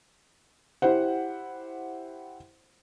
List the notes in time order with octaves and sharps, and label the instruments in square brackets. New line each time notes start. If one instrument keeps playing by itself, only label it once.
[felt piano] E4 G4 C5 F#5